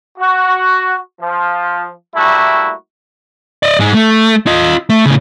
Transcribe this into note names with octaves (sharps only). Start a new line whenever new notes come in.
F#4
F3
G3 A3 A#3 E4 F#4
D5 D#5
G#2 G#3
A3
F4 D#5
A3
A2 C#3